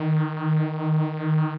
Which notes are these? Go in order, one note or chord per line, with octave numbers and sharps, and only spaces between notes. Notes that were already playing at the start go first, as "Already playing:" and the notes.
Already playing: D#3